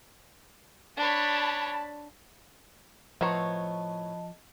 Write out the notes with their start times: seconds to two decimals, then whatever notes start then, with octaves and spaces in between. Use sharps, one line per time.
0.97 D4 C#5 A5 B5
3.21 A2 F3 B3 C5 C#5 D#5 A5 A#5